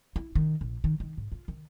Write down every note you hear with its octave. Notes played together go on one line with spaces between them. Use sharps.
E4
D#3
A#1
D#3
D#3
G#2
F4
D#3